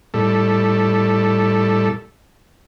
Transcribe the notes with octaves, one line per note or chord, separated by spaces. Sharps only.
A2 G3 A4